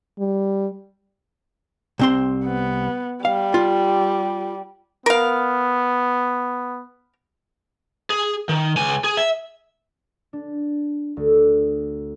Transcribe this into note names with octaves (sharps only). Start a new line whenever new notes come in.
G3
C2 C4 C6
B3
G3 F5
F4
B3 A#4 F5
G#4
D#3
C#2 G#5
G#4
E5
D4
D2